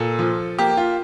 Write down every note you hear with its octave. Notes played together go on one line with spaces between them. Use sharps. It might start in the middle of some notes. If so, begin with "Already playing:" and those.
Already playing: A#2 A4
F3
A#3 G4
F4